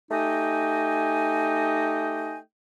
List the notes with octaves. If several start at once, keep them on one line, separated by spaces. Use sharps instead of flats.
A3 D#4 G4 D#5 G5 G#5